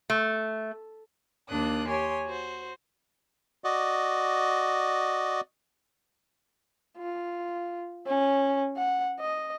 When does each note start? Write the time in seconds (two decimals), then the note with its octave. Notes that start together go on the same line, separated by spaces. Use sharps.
0.10 A3
1.48 D#2 A#3 D4 D#6 F#6
1.87 G4 C#5 G#5 C6
2.25 F#4 C5
3.64 F#4 D5 D#5
6.97 F4
8.07 C#4
8.77 F#5
9.20 D#5